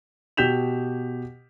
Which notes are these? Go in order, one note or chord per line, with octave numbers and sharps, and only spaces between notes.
B2 G4 G6 B6 E7 F7